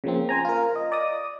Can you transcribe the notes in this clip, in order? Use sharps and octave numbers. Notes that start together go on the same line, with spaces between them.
C#3 F3 A#3 C4
C5 G#5 A#5
F4 A#4
D#5
D5 D#5 D#6